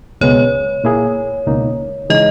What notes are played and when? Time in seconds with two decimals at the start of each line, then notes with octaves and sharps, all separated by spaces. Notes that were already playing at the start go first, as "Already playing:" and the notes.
0.21 C#2 B2 G#3 B3 C#5
0.84 A#2 A#3 E4 G#4
1.47 C#2 B2 A#3 D#4
2.10 C#3 E3 G#3 D#4 D#5